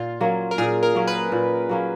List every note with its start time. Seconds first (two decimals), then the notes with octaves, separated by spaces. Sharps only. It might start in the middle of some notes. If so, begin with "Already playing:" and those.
Already playing: A#2 F4
0.21 F#3 A#3 C#4
0.51 A#4
0.58 A#2 G#4
0.83 A#4
0.95 F#3 A#3 C#4
1.07 B4
1.32 A#2
1.69 F#3 A#3 C#4